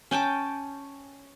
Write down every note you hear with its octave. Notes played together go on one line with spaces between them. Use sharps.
C#4 G5 A5 D6